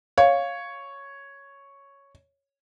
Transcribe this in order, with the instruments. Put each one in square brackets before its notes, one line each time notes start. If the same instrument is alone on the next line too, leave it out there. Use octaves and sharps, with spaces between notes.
[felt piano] C#5 [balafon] F5